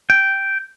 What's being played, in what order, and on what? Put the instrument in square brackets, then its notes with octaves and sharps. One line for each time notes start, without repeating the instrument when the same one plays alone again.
[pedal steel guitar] G5